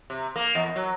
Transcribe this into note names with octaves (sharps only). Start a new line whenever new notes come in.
C3
A#3
E2
F#3